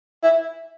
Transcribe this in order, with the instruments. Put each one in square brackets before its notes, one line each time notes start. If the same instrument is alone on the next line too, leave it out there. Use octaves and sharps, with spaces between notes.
[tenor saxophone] E4